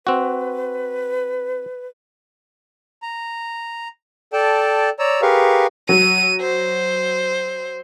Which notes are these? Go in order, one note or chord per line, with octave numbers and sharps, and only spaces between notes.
C4 F#4 B4
A#5
A4 D5 G5 A5
C#5 D5 A#5 E6
G4 G#4 A#4 B4 F5 C#6
F#3 D#7
C5